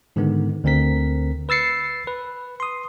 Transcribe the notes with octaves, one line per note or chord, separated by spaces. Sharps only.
G#2 D3 D#3 G#3 B3
D2 D3 C4 A#4 B6
B4 E6 A6 C7 C#7
B4
C6 D#6